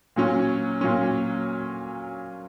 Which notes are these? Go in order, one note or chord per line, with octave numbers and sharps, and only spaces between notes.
A#2 F#3 C#4
A#2 F#3 C#4